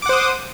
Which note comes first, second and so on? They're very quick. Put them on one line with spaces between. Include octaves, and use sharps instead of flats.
D6 F#5 C5 D#6